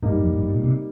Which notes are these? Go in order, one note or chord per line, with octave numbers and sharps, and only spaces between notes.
G#2 G3 A#3 D#4
G2
F2
G2
G2
A#2
C3